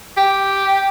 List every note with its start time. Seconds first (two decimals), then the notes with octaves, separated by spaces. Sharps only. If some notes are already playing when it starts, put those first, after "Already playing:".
0.17 G4